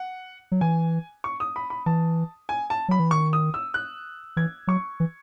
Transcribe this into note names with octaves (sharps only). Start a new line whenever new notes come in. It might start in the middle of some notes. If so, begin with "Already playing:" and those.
Already playing: F#5
F#3
E3 G#5
C#6
D#6
B5
B5
E3 A5
G#5
A5
F#3 B5
E3
D#3 C#6
D#6
E6
F#6
E3 G#6
F#3 C#6
E3